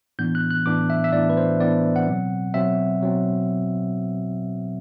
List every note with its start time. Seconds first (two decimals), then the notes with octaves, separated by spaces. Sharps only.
0.19 A2 E3 B3 D4 G6
0.35 F#6
0.51 F#6
0.66 A2 E3 B3 D4 D6
0.90 E5
1.04 E5
1.13 A2 E3 B3 D4 D5
1.30 B4
1.37 C5
1.60 A2 E3 B3 D4 D5
1.96 F#5
2.07 B2 F#3 C4
2.54 B2 F#3 C4 E5
3.02 B2 F#3 C4